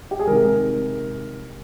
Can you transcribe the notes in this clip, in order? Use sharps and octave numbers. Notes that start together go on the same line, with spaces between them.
G4
G#4
C3 D#3 G#3 A#4